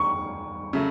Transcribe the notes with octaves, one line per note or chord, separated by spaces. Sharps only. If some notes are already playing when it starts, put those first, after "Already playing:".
Already playing: G2 C#6
C#3 F#3 A3